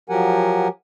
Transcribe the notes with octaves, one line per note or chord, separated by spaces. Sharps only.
F3 F#3 G4 A#4 F#5 G#5